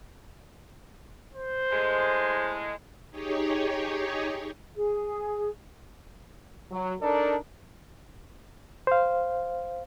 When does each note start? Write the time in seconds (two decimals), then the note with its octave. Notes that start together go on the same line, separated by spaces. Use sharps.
1.33 C5
1.71 A2 G#3
3.11 D#4 G4 G#4 C#5
4.75 G#4
6.71 F#3
7.01 D4 D#4 A4 A#4 D5
8.87 C5 F5